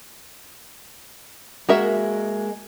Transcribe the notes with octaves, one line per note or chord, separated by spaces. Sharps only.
G#3 A#3 F#4 A#4 E5